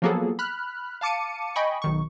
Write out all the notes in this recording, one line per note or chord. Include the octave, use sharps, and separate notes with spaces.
F3 F#3 A#3 B3 G#4 A4
B5 F6 F#6
F5 A5 D6 C#7 D#7
D#5 G5 G#5 B5 C#6
B1 D#3 C#6